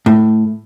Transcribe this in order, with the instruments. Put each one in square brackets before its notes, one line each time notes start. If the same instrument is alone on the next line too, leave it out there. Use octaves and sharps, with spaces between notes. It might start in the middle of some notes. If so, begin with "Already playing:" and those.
[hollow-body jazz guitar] A2